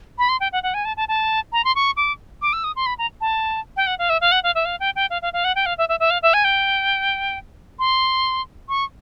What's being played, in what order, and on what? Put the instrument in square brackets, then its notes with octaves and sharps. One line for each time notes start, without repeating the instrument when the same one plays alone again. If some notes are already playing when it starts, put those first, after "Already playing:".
[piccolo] B5
C6
G5
F#5
F#5
G#5
A5
A5
A5
A#5
C6
C#6
D6
D6
E6
D#6
C6
B5
A#5
A5
G5
F#5
F5
E5
F5
F#5
F5
E5
F5
G5
G5
F5
F5
F5
F#5
G5
F5
E5
E5
E5
F5
E5
G#5
G5
C6
C#6